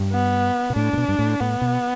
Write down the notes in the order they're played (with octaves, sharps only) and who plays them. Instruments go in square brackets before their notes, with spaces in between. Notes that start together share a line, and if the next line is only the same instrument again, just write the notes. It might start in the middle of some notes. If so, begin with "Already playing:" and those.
Already playing: [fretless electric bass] G2
[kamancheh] B3
[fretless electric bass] B2
[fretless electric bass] A2 [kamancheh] D4
[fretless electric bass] A2
B2
G2
A2
[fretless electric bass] A2 [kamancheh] B3
[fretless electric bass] B2